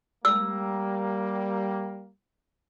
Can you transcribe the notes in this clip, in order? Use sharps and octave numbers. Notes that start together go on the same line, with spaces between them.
G3 A#3 E6